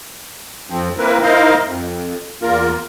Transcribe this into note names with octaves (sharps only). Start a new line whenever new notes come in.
F2 F3 C4
A#3 C4 E4 A#4 B4
D#4 E4 A#4 C5 D#5 F5
F2
E2 A#3 F4 A#4